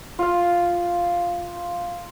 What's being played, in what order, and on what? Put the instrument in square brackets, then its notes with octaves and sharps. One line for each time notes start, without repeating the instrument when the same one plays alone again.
[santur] F4 F5